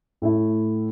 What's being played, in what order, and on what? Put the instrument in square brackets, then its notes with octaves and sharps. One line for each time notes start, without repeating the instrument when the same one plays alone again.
[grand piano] A2 A3 E4